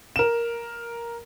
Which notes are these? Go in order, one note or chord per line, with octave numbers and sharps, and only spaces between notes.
A#4 E7